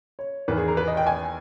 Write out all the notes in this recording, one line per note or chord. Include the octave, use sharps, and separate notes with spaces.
C#5
E2 D#3 B4
G#4
A#4
B4
D#5
G5
G#5